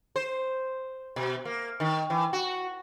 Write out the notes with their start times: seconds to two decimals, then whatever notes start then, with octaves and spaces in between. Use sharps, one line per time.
0.16 C5
1.16 B2
1.45 A#3
1.80 D#3
2.10 E3
2.33 F#4